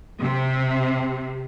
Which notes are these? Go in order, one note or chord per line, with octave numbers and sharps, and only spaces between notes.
C3